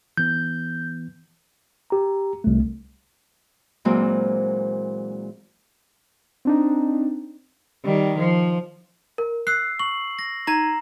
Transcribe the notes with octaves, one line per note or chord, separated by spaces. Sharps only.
E3 B3 G6
G4 A#5
C2 A3
A#2 E3 F#3 G#3 A#3 C4
C4 D4 D#4
D#3 G3
F3
A#4
E6 F#6 C7
C#6 F#7
A#6
D#4 A#5 G#6 D#7